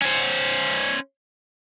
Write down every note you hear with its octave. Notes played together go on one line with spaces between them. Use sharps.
C#4 C5